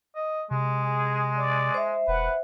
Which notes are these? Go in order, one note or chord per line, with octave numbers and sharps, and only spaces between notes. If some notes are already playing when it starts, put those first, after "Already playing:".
D#5
C3 G#3
G#4
D5
C5 E5
E1 B4 F#5